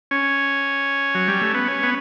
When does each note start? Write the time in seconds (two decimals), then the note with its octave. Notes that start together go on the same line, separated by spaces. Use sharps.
0.11 C#4
1.15 F#3
1.28 G3
1.42 A3
1.54 B3
1.68 C#4
1.83 B3